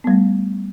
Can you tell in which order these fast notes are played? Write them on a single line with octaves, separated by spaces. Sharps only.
B3 G3 A3